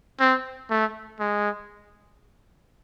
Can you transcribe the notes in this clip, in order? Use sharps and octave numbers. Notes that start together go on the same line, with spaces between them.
C4
A3
G#3